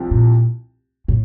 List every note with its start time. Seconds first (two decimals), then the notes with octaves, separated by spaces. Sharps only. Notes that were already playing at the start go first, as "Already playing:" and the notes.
Already playing: C2 C3 F3 C4 G4
0.11 A#2
1.08 A2